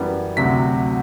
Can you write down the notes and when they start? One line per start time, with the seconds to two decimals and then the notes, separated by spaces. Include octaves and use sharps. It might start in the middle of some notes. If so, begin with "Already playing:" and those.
Already playing: F#2 E3 G3 B3
0.36 D2 C3 F#3 B6